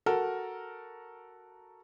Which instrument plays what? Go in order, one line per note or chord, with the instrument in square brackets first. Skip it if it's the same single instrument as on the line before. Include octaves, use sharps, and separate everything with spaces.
[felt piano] F#4 A4 A#4